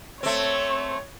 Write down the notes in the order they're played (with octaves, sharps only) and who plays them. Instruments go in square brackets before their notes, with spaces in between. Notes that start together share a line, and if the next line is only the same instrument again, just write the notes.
[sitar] A3 C4 [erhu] C#5